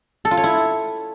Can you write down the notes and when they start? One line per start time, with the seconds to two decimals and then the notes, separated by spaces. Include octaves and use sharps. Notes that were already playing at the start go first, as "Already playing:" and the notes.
0.25 A4
0.31 F4
0.37 C#5
0.44 E4